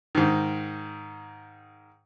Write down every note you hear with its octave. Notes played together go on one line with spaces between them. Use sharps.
G#2 D#3